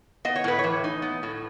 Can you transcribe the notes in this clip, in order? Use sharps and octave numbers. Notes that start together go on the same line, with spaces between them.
B3 D#5
C#5
A2 B4
E3 C#5
D#4
B3
A2